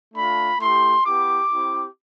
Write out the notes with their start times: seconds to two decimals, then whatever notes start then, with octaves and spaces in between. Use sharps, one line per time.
0.15 A3 D4 F4 B5
0.59 A3 E4 G4 C6
1.05 B3 E4 G4 D6
1.50 C4 E4 G4